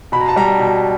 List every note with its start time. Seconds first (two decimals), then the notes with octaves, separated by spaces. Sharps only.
0.12 B2 B5
0.21 A#5
0.29 A5
0.36 G3 A#5
0.59 B2